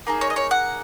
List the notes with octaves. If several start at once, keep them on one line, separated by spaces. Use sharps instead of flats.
A#3 D#4 G#4
C#5
D#5
C#5
F#5